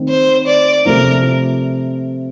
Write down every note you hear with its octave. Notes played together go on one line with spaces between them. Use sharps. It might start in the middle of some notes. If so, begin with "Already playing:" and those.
Already playing: D#3 A3 C4
C5
D5
C3 F3 A3 C4 F4 A#4